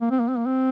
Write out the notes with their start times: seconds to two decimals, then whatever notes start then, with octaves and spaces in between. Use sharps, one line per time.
0.02 A#3
0.11 C4
0.20 A#3
0.28 C4
0.37 A#3
0.46 C4